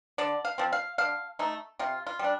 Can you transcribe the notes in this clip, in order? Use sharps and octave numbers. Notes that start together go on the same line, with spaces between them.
D3 D5
F5
F3 C4
F5
D3 F5
A3 D#4
C3 F4
F4
G3 D4